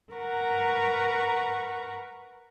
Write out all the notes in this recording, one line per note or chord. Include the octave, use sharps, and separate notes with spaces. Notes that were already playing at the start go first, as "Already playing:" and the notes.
A#4 B4 F#5 A#5 C#6